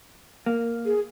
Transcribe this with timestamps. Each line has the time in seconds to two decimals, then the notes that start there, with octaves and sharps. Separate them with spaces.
0.46 A#3
0.86 G#4